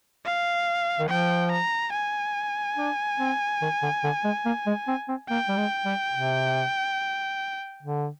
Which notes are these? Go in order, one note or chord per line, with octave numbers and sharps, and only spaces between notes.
F5
D#3
F3 G5
A#5
G#5
D4
C4
D#3
D3
D3
G#3
A#3
G#3
C4
C4
A#3 G5
G3
G#3
G3
C3
D3